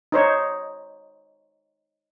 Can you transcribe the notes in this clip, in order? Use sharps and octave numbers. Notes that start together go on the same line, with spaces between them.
D#4 C5 C#5